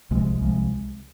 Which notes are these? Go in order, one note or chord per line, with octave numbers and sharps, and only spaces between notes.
C2 C3 F3 G#3
C2 C3 F3 G#3